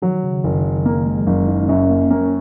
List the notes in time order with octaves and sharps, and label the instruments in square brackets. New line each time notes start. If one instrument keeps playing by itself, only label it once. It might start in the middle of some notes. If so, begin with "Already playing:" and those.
[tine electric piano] D#3 [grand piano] F#3
[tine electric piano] C#3
[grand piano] F#1 [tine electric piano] D#3
[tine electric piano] F#3 [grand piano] A#3
[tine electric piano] G#3
[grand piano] F#1 [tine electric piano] C#4
[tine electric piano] D#4
[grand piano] F#2 [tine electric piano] C#4
[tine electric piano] A#3
[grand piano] A#3 [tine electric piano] C#4